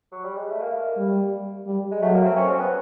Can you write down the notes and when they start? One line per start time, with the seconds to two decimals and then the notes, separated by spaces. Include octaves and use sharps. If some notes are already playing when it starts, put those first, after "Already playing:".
0.12 F#3
0.24 G3
0.37 G#3
0.50 A3
0.62 A#3
0.97 G3
1.67 G3
1.92 G#3
2.01 F#3 A3
2.14 A#3
2.25 C4
2.37 C#4
2.49 C4
2.60 B3